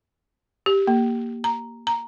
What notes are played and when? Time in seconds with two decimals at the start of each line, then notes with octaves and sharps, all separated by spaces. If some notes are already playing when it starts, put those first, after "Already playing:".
0.66 G4
0.87 A#3
1.44 A#5
1.87 A#5